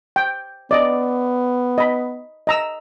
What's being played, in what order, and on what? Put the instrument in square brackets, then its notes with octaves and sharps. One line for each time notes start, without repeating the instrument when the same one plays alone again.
[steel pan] G5
[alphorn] B3 [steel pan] D5 D#5
[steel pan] D#5 B5
D#5 A#5 E6